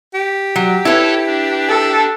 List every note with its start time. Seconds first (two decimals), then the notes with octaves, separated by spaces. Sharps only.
0.15 G4
0.56 F#3
0.85 E4 A4 B4 C#5 A5
1.26 D4
1.69 A4